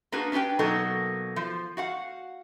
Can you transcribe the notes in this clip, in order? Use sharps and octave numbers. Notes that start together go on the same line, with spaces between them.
A#3 D4 F#4 G#4 B4
C#4 D4 G4 B4 G5
B2 F#3 A#3 D#4 A4 A#4
F3
F#4 F5 F#5